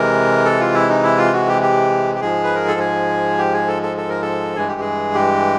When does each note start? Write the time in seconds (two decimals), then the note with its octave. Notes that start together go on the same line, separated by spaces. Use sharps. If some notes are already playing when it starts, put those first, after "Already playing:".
Already playing: C3 E3 G#3 A#4
0.45 A4
0.60 F4
0.74 E4
0.89 D#4
1.03 E4
1.18 F4
1.33 F#4
1.48 G4
1.62 G4
2.15 G4
2.21 G#2 F3 G#3 G#4
2.44 B4
2.55 A#4
2.67 A4
2.79 G#4
3.38 G4
3.53 G#4
3.68 A4
3.83 A4
3.97 A4
4.09 A#4
4.22 A4
4.56 G2 E3 G#3 G#4
4.68 G4
4.81 G#4
5.14 G4